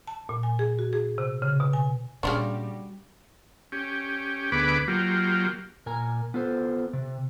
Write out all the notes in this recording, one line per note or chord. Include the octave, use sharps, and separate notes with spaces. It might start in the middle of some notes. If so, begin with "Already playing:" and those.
A5
A#2
G#5
G#4
F#4
G#4
C3
C#3
B2
G#5
A#2 C#3 G3 C#4 D4 F#4 C6 C#6
C#4 G4
D2 B3 G#4 B4 D6
F#3 A#3 F4 G4
A#2 A#4 G#5 A#5
B3 F4 A4 C5
C3